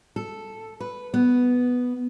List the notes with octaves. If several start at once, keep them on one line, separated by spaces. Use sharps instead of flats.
A4
B4
B3